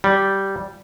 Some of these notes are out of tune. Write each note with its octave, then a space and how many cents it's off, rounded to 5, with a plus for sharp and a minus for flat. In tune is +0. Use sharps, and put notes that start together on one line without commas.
G3 -10